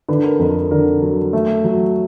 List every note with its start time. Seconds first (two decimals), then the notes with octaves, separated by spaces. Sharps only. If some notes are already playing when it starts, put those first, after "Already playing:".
0.09 D3 B4
0.24 A#4
0.39 F2 A#4
0.71 D3 A#4
1.02 F#3
1.33 A3
1.64 F#3